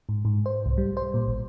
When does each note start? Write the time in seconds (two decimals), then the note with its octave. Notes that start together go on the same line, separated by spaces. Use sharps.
0.09 G#2
0.25 G#2
0.46 C5
0.66 C2
0.78 G3
0.97 C5
1.14 A#2
1.28 A1